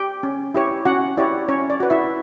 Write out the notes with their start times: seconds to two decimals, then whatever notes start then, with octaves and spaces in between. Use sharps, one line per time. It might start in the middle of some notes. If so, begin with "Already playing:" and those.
Already playing: G4 G5
0.23 C#4
0.54 E4 G4 C#5
0.85 C#4 F#4 F#5
1.17 E4 G4 C#5 D5
1.48 C#4 C#5
1.70 D5
1.80 F#4 B4
1.90 E4 E5